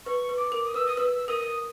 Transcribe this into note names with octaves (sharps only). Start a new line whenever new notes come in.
B4 C#6
B4
D6
A#4
D#6
B4 E6
D#6
B4 E6
A#4 D#6